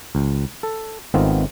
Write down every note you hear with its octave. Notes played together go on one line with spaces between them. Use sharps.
C#2
A4
G#1 D#3 A3 B3 C4 F4